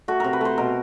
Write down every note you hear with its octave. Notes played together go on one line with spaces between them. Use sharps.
A3 F#4
C3 A#4
B4
A3 C5
B2 A#4